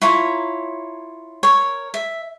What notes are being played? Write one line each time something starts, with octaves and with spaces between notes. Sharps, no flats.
E4 F4 C#5 A#5
A#4 C#5
E5